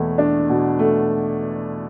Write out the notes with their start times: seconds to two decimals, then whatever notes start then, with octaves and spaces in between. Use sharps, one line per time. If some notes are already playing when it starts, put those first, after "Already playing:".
Already playing: E2 B2 A3
0.18 D4
0.49 B2
0.79 A3